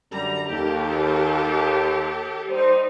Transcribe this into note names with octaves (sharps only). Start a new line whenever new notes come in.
F#2 D3 G3 A#5
D#2 G4 A4
G3 D#4 C5